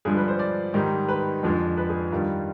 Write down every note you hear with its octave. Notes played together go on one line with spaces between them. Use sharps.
G2 D3 F3 G#3 G#4
B4
C5
D5
G#2 D#3 G3
B4
F2 D3 F3 G#3
B4
G#4
G2 D#3 G3 F4